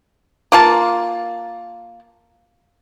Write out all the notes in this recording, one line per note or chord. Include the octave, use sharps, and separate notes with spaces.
A#3 F4 A5